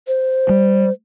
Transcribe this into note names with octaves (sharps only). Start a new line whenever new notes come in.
C5
G3